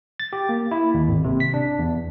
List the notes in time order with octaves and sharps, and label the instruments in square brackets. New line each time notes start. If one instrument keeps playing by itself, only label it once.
[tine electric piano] A6
G4
A#3
E4
D#2
G#1
C3
B6
D4
E2